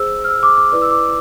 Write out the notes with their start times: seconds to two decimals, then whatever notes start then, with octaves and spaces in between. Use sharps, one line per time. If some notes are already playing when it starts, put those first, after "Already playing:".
Already playing: G#4 C5 E6
0.24 F6
0.29 E6
0.43 D6
0.57 D6
0.72 E4 B4 D5 D6
0.82 E6
0.91 D6